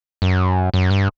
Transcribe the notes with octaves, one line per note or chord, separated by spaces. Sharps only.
F#2
F#2
G2